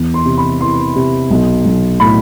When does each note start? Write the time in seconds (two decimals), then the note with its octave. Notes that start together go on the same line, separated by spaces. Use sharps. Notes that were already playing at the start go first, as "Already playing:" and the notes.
Already playing: E2
0.14 C6
0.25 C3
0.38 B5
0.60 E3 C6
0.96 C3
1.31 B1
1.65 B1
2.00 A2 B5